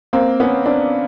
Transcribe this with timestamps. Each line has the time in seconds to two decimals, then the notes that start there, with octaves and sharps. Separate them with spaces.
0.13 A#3 C4
0.40 B3 C#4
0.66 C4 D4